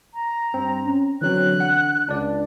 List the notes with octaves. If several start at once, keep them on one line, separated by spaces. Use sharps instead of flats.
A#5
G2 C4
C#4
D3 E3 F#3 C4 F#6
F#5
C#2 D4 D5